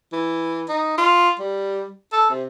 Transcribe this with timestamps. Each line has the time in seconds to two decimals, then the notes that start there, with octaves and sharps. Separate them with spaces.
0.13 E3
0.69 D#4
0.98 F4
1.39 G3
2.12 A4
2.30 C3